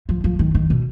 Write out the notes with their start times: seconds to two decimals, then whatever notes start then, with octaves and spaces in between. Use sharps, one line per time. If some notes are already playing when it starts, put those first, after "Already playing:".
0.09 F3
0.24 F3
0.39 D#3
0.55 D#3
0.70 B2